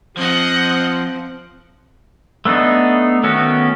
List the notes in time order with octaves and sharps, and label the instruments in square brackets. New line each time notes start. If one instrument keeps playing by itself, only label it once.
[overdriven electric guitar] F3 [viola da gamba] C4 [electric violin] D#5 F#5
[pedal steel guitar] A3 B3 D4 D#4
D#3 A3 B3 C#4 F#4